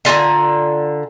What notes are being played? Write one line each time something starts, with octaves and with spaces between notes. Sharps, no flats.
D3 F4 G#5 A#5